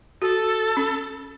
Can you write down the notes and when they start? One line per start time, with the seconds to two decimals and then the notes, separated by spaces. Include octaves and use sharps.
0.22 F#4 A4
0.77 C#4